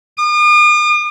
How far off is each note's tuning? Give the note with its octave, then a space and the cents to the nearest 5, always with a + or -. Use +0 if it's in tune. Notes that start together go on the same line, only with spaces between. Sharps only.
D#6 -45